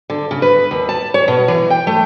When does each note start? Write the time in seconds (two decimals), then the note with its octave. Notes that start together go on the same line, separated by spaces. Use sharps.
0.10 D3
0.31 C#3
0.42 B4
0.71 D#2
0.89 A5
1.14 C#5
1.28 B2
1.48 E3
1.70 G5
1.87 A3